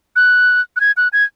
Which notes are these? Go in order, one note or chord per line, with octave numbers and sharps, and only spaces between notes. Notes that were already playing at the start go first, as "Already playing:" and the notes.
F#6
F#6
G#6
F#6
G#6